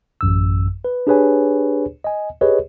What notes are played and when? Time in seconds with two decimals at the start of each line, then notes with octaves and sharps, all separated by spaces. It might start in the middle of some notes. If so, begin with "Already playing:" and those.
0.21 A1 F#2 E6
0.85 B4
1.07 D4 G4 G#4 B4 C#5 G#5
2.04 D#5 G#5
2.41 G4 G#4 B4 C#5 D#5